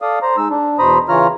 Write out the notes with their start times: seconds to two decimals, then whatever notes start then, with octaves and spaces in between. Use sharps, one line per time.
0.02 A4 D5 F5 D#6
0.22 C5 A#5
0.37 G#3 D#4 E6
0.50 D4
0.79 E2 B2 C5 A#5 B5 D#6
1.08 C#3 E3 F4 C#5 A#5 F6